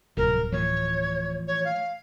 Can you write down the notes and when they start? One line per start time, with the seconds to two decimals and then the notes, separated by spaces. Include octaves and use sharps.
0.17 D1 C2 C3 F3 A#4
0.52 A2 E3 F3 C#5
1.47 C#5
1.64 F5